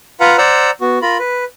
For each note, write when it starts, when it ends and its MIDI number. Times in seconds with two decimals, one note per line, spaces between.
0.20 0.37 65
0.20 0.37 71
0.20 0.37 77
0.20 0.37 78
0.20 0.37 82
0.38 0.71 72
0.38 0.71 74
0.38 0.71 78
0.38 0.71 82
0.38 0.71 88
0.81 0.99 59
0.81 0.99 66
1.02 1.18 65
1.02 1.18 70
1.02 1.18 83
1.19 1.44 71